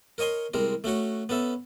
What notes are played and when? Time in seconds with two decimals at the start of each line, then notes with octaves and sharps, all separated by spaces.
0.18 A#4 C#5 D#5 G#5 C6
0.54 C2 G#3 C4 A#4
0.84 A3 C#4 F#4 C#5
1.29 B3 C#4 A4 E5